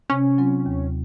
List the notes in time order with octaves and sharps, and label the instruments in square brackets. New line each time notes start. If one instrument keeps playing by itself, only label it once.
[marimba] C3 [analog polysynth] C#4
[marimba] F#3 C4 F4
D#2